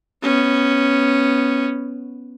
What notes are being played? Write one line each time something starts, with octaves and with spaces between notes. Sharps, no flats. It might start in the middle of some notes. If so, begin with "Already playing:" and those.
B3 C#4